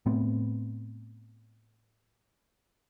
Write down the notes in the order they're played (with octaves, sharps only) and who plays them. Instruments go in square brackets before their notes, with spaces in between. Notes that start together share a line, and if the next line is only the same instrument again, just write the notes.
[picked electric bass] A2 A3 B3 C4